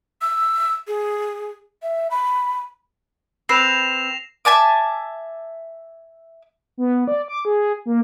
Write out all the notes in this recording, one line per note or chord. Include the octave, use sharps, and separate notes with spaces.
E6
G#4
E5
B5
C4 B4 A#6 C7 E7 F7
E5 G#5 A5 D6
B3
D5
D6
G#4
A#3